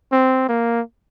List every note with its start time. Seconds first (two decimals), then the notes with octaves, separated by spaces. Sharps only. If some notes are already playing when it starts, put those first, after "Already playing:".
0.12 C4
0.48 A#3